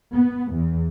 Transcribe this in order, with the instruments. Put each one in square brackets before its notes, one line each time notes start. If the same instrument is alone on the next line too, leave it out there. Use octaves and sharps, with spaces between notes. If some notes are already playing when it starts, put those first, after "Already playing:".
[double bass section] B3
E2